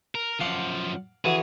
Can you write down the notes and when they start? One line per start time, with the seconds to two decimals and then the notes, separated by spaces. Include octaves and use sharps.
0.15 A#4
0.40 F#2 F3 F5 F#5 D6
1.25 D3 E3 F#3 G#4